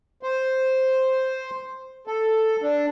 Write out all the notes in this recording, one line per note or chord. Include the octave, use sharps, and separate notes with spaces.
C5
A4
D4